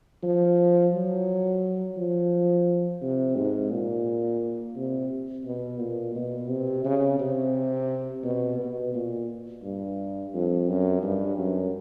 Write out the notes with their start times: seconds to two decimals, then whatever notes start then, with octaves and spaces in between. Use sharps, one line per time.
0.23 F3
0.93 F#3
1.97 F3
3.02 C3
3.36 G#2
3.71 A#2
4.76 C3
5.46 B2
5.80 A#2
6.15 B2
6.49 C3
6.85 C#3
7.20 C3
8.24 B2
8.59 B2
8.94 A#2
9.63 G2
10.34 F2
10.68 F#2
11.03 G2
11.38 F#2